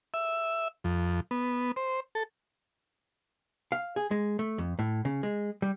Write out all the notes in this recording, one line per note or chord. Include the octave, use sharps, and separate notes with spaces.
E5
F2
B3
C5
A4
F5
G#4
G#3
A3
F2
A2
C#3
G#3
G3